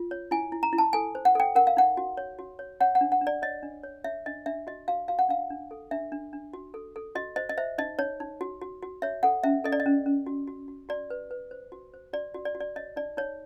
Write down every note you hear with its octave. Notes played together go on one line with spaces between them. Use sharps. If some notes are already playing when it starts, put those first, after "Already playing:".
Already playing: F4
C#5
E4 G#5
E4
A#5
E4
A5
A4 G#5
C5
F#5
A4 G5
A#4 F#5
F5
D#4 F#5
F#4
C#5
F#4
C#5
C#5 F#5
F#5
D4
F#5
D4
D5
C#5 D#5
D4
C#5
C#5 E5
D4 D#5
D4 E5
F#4 D#5
F#4 F5
F#4 F5
F#5
D4 F5
D4
A4
D4 E5
D4
D4
F#4
A4
A4
F#4 D#5
C5 D#5
D#5
C5 E5
D#4 D#5
D#4 C#5
D#4
F#4
F#4
F#4
C#5 E5
A4 F#5
C#4 E5
A4 D#5
D5
D#5
C#4
C#4
F#4
F#4
F#4
F#4 D5
B4
B4
C5
F#4
C5
F#4 D5
F#4
D5
F#4
D5
C#5 D#5
D#4 D5
D#4 C#5